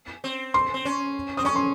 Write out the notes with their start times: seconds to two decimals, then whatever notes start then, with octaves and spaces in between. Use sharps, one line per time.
0.24 C4
0.54 C6
0.74 C4
0.85 C#4
1.37 C4 D#6
1.45 C#4 C#6
1.56 C6